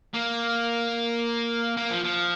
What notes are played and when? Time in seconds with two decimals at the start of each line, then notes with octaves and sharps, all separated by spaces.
0.14 A#3
1.77 A#3
1.91 F3
2.05 F3